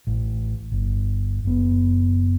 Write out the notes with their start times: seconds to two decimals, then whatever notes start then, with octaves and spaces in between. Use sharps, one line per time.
0.07 A1
0.72 G1
1.45 F#1 B3